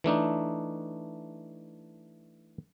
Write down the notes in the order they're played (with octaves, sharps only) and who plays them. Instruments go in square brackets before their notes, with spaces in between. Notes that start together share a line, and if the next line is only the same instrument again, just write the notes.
[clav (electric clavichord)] E3 A3 D4 D#4